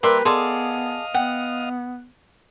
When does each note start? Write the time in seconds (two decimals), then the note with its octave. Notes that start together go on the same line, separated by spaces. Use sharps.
0.03 G3 A#3 A#4 B4 D5 E5 C6
0.25 B3 G#4 A4 D5 D#5 F5 C6
1.14 B3 F#5 G5